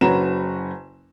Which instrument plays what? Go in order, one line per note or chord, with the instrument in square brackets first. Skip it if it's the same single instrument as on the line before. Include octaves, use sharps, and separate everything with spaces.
[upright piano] F#1 C#4 F#4 B4 A#5 E7